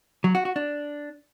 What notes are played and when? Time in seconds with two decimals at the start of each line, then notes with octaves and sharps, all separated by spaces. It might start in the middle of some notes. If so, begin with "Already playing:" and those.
0.24 F#3
0.35 F#4
0.45 F#4
0.56 D4